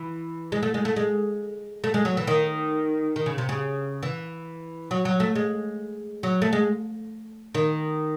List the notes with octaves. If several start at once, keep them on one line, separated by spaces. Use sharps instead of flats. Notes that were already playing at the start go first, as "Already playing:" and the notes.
Already playing: E3
G#3
A3
G#3
A3
G#3
A3
G#3
F#3
E3
D#3
D#3
C#3
C3
C#3
E3
F#3
F#3
A3
G#3
F#3
A3
G#3
D#3